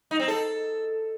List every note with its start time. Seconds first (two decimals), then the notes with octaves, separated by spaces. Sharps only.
0.11 D#4
0.19 C4
0.28 A4